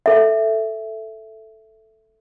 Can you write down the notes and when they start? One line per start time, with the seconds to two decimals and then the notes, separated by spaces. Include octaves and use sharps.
0.06 A4 E5